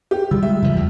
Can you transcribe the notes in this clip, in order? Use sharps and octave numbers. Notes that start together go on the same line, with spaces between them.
G4
D3 G3 F4 E6
G#3 E5
C#3 E3 F3
E2